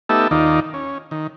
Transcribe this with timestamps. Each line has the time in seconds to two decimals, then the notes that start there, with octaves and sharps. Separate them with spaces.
0.09 A3 B3 D#4 G4 A4 E5
0.31 D#2 D#3 D#4 F4 D5
0.74 C#4
1.11 D#3